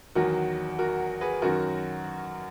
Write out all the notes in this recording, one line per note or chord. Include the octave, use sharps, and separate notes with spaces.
E2 D#3 F#3 F#4 A#4
F#4 A#4
G#4 B4
F#2 D#3 F#3 F#4 A#4